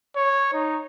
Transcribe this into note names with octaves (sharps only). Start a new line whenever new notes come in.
C#5
D#4